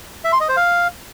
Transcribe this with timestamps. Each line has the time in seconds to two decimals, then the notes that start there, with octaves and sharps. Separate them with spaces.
0.24 E5
0.32 C6
0.41 D#5
0.49 C5
0.57 F5